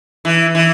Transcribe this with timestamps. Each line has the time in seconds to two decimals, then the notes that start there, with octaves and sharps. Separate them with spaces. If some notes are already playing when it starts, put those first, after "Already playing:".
0.25 E3
0.55 E3